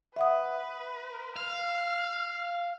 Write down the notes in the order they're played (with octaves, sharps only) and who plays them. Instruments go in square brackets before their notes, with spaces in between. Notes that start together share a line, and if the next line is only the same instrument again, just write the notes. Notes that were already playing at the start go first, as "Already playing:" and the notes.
[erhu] B4 [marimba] E5 F#5 D#6
[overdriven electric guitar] F5 [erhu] F6